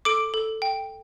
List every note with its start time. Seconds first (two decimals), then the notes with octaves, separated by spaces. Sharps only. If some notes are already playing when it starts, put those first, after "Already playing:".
0.05 A4 D6 D7
0.34 A4
0.62 G5